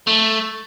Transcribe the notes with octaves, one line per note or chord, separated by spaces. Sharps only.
A3